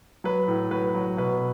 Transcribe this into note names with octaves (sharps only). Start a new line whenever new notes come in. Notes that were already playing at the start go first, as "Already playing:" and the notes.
F#3 B4
A2
F#3 B4
F#3
B2 B4